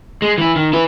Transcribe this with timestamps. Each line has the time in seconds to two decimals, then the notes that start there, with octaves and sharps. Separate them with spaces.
0.22 G#3
0.38 E3 E4
0.56 D#3
0.73 E4 B4